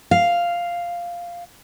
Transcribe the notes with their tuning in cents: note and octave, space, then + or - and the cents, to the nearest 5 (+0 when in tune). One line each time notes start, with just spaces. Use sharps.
F5 -5